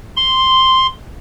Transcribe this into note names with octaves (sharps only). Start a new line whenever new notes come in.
C6